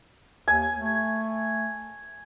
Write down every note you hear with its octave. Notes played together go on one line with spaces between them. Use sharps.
D#2 G#5
A3